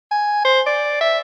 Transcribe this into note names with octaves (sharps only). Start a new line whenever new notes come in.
G#5
C5
D5
E5